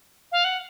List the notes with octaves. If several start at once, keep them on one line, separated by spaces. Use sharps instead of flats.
F5
F#5